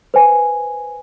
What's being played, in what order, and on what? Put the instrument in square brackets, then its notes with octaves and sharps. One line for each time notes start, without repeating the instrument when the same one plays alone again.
[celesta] B4 C5 G#5